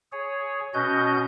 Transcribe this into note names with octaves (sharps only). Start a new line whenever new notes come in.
G#4 C#5
B2 C#4 F#4 D#5 G6